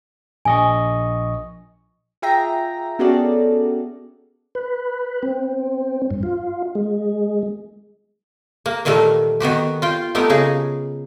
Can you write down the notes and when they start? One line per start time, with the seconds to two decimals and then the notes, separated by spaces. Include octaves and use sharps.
0.45 A#1 D#5 G#5 C#6
2.22 F4 G#4 E5 G5 A#5 A#6
2.99 B3 C#4 F#4 G#4 A4 D5
4.55 B4
5.23 C4
6.11 G2
6.23 F4
6.75 G#3
8.66 A#3
8.85 A#2 D#3 E3 G3 A3
9.40 D#3 B3 F#4 G4
9.82 F4 G5
10.15 A3 B3 D#4 G4 A#4
10.30 C#3 D#4 G#4